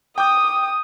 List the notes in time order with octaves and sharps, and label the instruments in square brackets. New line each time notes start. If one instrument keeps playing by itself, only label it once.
[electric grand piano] G5 D6 G6 [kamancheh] D#6